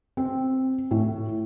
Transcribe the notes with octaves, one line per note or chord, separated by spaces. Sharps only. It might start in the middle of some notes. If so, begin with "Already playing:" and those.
C4
A2